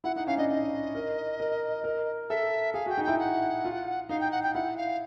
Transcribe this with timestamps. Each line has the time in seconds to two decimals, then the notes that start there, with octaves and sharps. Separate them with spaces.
0.04 E4 F#5
0.16 D#4 F#5
0.27 C#4 F5
0.38 D4 D#5
0.49 D#4 D#5
0.95 A#4
1.40 A#4
1.84 A#4
2.30 A4 E5
2.74 G#4 F5
2.86 F#4 G5
2.98 D#4
3.04 E4 G5
3.19 F#5
3.65 F4
4.09 D#4 F5
4.21 G5
4.32 F#5
4.43 G5
4.54 E4 F#5
4.77 F5